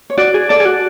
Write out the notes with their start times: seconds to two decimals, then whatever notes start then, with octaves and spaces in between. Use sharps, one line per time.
0.10 C#5
0.17 F#4 D5
0.34 G#4
0.49 A4 D5
0.60 G#4
0.65 F#4